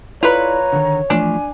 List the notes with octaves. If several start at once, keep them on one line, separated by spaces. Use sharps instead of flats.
E4 F4 A4 B4 C#5 D5 A#5
D3 D#3
E3 F3 A3 D4 G#5